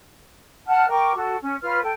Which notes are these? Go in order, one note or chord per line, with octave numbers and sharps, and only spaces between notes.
F#5 A5 F6 F#6
A#4 G5 C#6 D6
F#4 A4
C#4
F4 B4 C#5 F6
A4 G5